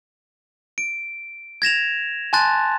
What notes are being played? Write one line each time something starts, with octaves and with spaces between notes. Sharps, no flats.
D7
G#6 A#6 E7 F7
G#5 A5 C6 F#6 A6